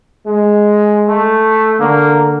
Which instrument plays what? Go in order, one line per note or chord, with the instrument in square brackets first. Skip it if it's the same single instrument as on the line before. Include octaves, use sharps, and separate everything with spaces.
[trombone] G#3
[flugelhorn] A3
[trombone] D3 [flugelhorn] A#3